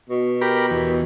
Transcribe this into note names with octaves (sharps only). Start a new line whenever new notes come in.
B2
G4 A#4 B5
E2